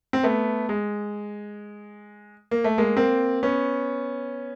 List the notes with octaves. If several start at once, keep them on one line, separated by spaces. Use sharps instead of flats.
C4
A3 B3
G#3
A#3
A3
G#3 A#3
A#3 C4
B3 C#4